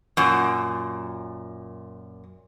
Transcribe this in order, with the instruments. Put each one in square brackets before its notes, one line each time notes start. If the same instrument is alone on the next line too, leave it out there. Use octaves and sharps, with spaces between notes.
[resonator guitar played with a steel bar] F#2 A#2